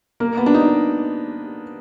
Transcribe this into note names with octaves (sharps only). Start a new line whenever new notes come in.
A#3
B3
D4
D#4